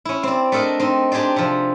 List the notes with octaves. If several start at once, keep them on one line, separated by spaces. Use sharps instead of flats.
C#4 E4
C4 D5
A3 D4 A4 A#4 D#5
C4 D#4
D4 G4 G#4 C5 D5
C3 F3